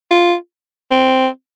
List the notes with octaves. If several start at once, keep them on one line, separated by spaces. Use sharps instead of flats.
F4
C4